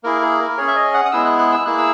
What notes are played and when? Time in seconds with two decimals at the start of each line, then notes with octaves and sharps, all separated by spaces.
0.03 A#3 E4 G#4 A#4
0.22 G#4
0.40 A#4
0.57 C#4 G#4 C#5
0.68 E5
0.76 D#5
0.94 F#5
1.05 D#6
1.12 G#3 B3 E4 G#4 E6
1.25 F#6
1.38 F#6
1.52 E6
1.65 A#3 E4 G#4 F#6
1.78 E6